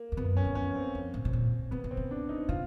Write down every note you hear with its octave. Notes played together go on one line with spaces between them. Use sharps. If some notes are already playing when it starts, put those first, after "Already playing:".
Already playing: A#3
F2
F#2 B3
C#4
F#2
F2 C#4
C4
F2
A2
B2
A#2
C#3 B3
C3
C4
C#3
D4
D#4
C3 F4